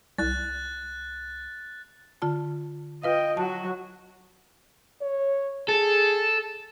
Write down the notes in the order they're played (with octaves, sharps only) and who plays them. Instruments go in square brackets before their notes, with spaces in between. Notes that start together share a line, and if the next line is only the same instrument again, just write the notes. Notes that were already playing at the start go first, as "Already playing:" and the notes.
[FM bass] C2 [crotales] F#6 A6
[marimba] D3 F4 A5
[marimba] F4 B4 F5 [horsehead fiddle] D#5 G5
[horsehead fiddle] F#3 F#4 [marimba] A5
[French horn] C#5
[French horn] G#4 [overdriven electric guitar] A4